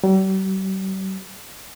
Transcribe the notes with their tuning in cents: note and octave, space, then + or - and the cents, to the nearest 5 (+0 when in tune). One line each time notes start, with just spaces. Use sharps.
G3 -45